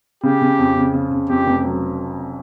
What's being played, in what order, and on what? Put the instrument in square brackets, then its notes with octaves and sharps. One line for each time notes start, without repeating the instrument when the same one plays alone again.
[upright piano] C#3 [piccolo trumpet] G4
[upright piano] C#3
F2
C#3
C#3
C#3
[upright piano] F2 [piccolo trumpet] G4
[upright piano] F1
F#3